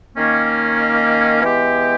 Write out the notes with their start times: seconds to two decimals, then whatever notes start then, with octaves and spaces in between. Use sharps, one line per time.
0.16 D#3 A#3 C#4
1.42 E3 G#3 B3 G4